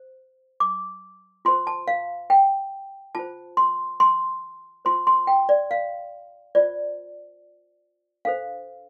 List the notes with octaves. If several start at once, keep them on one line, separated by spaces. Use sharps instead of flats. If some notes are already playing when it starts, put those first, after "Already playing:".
Already playing: C5
D6
F4 C5 C6
A5
F5
G5
F4 C5 A5
C6
C6
F4 C5 C6
C6
G5
D5
F5
F4 C5 D5
D4 A4 C5 F5